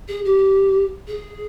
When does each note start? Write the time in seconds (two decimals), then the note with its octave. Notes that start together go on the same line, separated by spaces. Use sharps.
0.08 G#4
0.25 G4
1.08 G#4